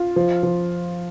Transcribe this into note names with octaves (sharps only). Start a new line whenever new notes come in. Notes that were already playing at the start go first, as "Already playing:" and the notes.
Already playing: F4
F3
F3